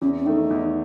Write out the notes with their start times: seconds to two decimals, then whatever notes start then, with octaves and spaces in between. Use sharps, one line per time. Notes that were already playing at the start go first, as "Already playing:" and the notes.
0.02 E2 C#4
0.18 C#4
0.26 D#3 A3 D#4
0.50 E2